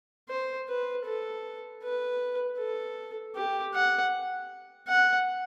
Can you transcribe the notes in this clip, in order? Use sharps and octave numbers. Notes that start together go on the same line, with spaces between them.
C5
B4
A4
B4
A4
G4
F#5
F#5